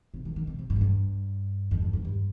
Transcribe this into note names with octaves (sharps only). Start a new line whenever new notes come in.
C3
D#3
D#3
C3
C3
G2
G#2
G2
F2
G2
F2
G2